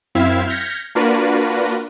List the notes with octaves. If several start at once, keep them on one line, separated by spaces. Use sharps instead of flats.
F#2 C4 E4 E5 F5 G#6
F6 G6 G#6 A#6 B6 C#7
A#3 D4 F4 F#4 A#4 B4